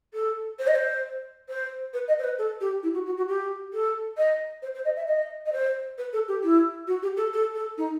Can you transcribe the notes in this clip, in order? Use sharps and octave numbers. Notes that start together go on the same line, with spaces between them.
A4
C5
D#5
C5
C5
B4
D#5
C5
B4
A4
G4
E4
F#4
F#4
F#4
G4
A4
D#5
C5
C5
D#5
E5
D#5
D#5
C5
B4
A4
G4
E4
F#4
G4
A4
A4
A4
D#4